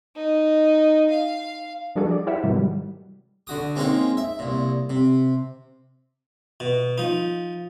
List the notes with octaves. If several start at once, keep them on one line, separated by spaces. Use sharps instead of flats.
D#4
F5
F3 G3 D4 F#4 G#4 A4
D5
E4 G4 C5 E5 F#5
G#2 C3 D#3 E3 F#3 G3
G3
D3 F#4 D#6
G#3 A#3 C4 C#4 D#4 G#4
E5
C2 A#2
C3
B2
F3 D#4